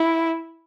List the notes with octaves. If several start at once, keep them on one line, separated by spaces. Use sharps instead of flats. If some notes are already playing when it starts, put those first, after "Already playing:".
Already playing: E4